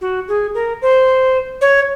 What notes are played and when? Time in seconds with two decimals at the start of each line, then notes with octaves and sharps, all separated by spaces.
0.01 F#4
0.28 G#4
0.55 A#4
0.82 C5
1.61 C#5